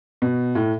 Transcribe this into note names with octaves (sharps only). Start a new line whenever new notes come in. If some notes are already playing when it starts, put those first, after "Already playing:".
B2
A2